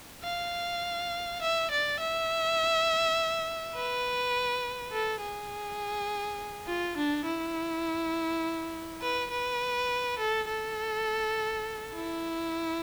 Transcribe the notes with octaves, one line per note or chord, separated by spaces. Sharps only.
F5
E5
D5
E5
B4
A4
G#4
F4
D4
E4
B4
B4
A4
A4
E4